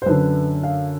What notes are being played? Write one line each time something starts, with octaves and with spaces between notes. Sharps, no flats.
C5
F#2 D3 B4
F5